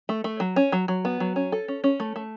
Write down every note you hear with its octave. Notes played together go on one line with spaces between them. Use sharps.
A3
A3
F#3
C#4
F#3
F#3
B3
F#3
C#4
A4
C#4
C#4
A3
A3